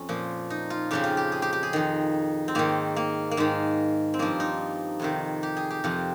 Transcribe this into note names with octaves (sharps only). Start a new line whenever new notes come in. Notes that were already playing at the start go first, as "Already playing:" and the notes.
Already playing: F2 C#4
A#2 F3
D#4
F4
F2 C#3 F3 G4
F4
G4
G#4
G4
G4
G#4
F2 D#3
C4
G#2 D#3 A#3
A#3
A#3
G#2 D#3 G#3
C4
G2 F3 A#3
D#4
F2 C3 D#3
G4
G#4
G4
F2 C3 F3